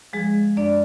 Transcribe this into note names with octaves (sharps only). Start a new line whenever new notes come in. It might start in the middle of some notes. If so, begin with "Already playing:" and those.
F3 G#3 G#4
F#2 D4 D5